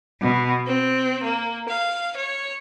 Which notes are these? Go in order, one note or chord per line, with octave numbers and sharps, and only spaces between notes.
B2
C4
A#3
F5
C#5